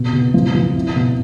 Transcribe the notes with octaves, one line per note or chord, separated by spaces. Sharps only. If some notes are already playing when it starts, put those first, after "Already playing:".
Already playing: B2
B2
F3
F3
E4
B2